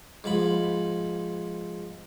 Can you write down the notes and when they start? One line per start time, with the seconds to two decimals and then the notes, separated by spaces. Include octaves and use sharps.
0.24 G#2 F3 B5